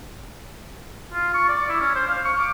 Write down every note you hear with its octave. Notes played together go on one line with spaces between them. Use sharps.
F4
C#6
D5
E4
C#4
C5
F5
C#6
D6